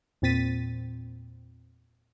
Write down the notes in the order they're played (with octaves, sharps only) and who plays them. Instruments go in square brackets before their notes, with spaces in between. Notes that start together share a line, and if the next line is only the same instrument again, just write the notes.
[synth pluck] E2 A#2 C4 A6 B6 D#7